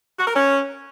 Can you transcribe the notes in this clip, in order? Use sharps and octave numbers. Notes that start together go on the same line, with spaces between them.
F#4
A#4
C#4